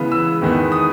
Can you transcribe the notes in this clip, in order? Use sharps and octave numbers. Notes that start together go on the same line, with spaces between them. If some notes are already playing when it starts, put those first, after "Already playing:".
Already playing: C#3 E3 G#3 B3
E6
E2 D#3 G#3 B3
D#6